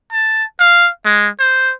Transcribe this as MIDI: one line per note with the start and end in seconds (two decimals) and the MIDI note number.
0.12 0.44 81
0.59 0.90 77
1.05 1.28 56
1.40 1.73 72